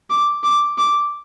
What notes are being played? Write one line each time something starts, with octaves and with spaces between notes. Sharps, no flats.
D6
D6
D6